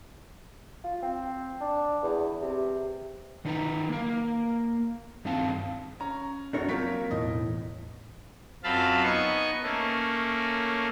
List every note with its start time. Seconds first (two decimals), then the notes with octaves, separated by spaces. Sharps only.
0.84 F4
1.03 C4
1.61 D4
2.03 E2
2.42 C3
3.45 D#3 D4 D#4 B4 A#5
3.89 A#3 A#4
5.25 G2 D#3 C4 F5 A5
6.00 C#4 A#5
6.53 F#2 D4 A#4 C#5
6.69 F#3 A#3 C4 F4 A#4 B6
7.11 B1 E2 A2 D#5
8.64 F#2 C4 F4 F5 A5 B5
9.03 B3 D#4 G#5 C#6
9.63 A3 A#3 C#4